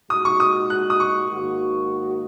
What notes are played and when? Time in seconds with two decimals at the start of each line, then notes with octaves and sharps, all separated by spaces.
0.10 A#2 G#3 D#4 F#4 D#6
0.25 C#6
0.40 D#6
0.70 F#6
0.90 D#6
1.00 C#6
1.31 G#2 D#3 A#3 F#4